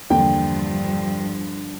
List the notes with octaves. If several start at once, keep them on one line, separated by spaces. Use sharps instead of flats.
E2 G2 D3 F3 A#3 D4 G5